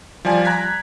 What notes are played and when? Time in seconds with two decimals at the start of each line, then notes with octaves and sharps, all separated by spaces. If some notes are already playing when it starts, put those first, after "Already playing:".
0.25 F3 G3 D5 G#5 A5
0.45 A#5 F#6 G#6 B6